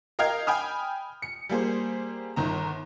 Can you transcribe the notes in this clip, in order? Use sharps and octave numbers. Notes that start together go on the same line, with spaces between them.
A#4 D#5 F5 G5 F6 G#6
G5 G#5 B5 D#6 F6
C#7
G3 A#3 G#4 C5
G1 D#3 A#5